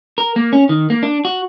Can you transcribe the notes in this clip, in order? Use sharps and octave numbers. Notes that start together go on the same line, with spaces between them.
A#4
A#3
C#4
D#3
A#3
D4
F#4